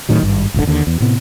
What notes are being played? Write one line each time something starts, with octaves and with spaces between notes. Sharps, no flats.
D1 A2 D#3 F#3
G#1 G2
D1 G1 C#2 D3
D#2 D3
E2
A2 C3 B3